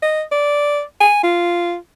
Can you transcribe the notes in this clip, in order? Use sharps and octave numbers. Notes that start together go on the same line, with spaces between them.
D#5
D5
G#5
F4